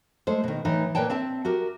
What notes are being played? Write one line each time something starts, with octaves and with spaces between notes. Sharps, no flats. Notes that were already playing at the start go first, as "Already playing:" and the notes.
G#3 A3 C5
B2 D#3
A2 E3 D#4
A#2 B4 C#5 G5 A5
C4 E5 A5
F#4 G4 A#4